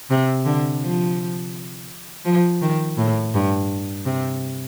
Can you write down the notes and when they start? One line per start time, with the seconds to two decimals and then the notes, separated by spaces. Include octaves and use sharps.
0.10 C3
0.45 D3
0.82 F3
2.25 F3
2.62 D#3
2.97 A2
3.34 G2
4.05 C3